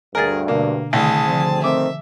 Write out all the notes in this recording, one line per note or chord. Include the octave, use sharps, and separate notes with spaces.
D2 G2 G#4 A#4 G#5 A6
B2 D3 A#3 D4
C2 D3 D#3 A3 G#4 A5
D2 D3 F3 C4
D#3 A3 C4 E5 D6